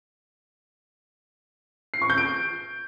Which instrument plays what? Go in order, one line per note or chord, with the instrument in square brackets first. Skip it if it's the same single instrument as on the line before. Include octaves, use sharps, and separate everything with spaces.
[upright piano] C7
C#6
G6
D7